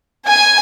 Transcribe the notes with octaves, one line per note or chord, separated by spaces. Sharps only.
G#5